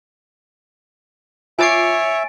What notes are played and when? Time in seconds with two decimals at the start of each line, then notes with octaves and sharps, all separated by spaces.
1.59 F4 C#5 E5 G#5 D6 A6 C7 D7